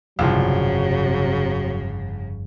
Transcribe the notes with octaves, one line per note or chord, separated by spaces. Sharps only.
G1 C2 F2 C#3 F3 F#3